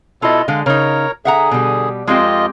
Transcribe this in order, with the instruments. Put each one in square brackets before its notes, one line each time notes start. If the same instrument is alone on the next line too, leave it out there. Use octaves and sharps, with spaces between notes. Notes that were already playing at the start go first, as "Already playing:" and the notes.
[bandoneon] B2 E4 A4 [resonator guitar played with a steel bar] F4 D#5
[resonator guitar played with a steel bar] D3 G#3 [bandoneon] F5
[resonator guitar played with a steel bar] C#3 D#4 [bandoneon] A#4 C#5 A#5
[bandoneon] D3 G#4 [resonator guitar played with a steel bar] E5 F#5 A#5
[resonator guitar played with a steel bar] B2 G3
[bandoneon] F2 F4 D#5 [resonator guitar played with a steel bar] G#3 C4 G4